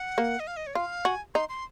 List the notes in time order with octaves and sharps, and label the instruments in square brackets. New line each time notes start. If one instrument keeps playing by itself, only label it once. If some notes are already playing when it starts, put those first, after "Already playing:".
Already playing: [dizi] F#5
[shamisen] A#3
[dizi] D#5
F5
D#5
C#5
[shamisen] F4 [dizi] F5
[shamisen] F#4 [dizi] G#5
[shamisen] D#4 [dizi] C6
[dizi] C6